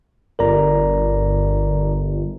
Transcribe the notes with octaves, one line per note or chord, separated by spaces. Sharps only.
G1 A#4 D5 A#5